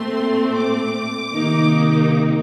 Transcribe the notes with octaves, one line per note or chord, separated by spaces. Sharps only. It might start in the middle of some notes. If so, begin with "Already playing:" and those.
Already playing: A#2 A3 C4 C6
D6
C3 D#3 A#3 D#4